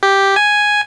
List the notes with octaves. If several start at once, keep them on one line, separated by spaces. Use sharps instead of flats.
G4
G#5